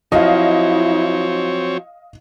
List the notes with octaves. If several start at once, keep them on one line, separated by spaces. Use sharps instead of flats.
F3 F#3 C4 E4 F#4 C#5 D#5 F5